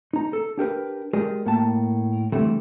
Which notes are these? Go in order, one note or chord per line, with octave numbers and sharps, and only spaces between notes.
D#4 A#5
A4
D4 G4 A#4 B4
G#3 G4 G#4 A#4 D5
A2 A#3 A#4 G5 A5
D3 E3 G3 A3 C4